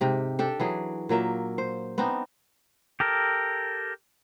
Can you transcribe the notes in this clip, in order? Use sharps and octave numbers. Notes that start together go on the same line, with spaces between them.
G#2 C3 G4
D4 G4 A4
E3 F#3 G#4
A#2 F#3 A#3 E5
C5
B3 C4 D4 D#4
G4 A4 A#4